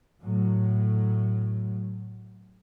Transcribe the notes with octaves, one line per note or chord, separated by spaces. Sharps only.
A2 F#3